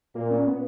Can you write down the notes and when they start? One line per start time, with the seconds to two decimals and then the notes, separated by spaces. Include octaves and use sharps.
0.15 A#2 A#3
0.31 C#4
0.47 B3